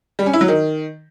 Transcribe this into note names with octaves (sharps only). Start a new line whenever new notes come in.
G3
C#4
E4
F#3
D#3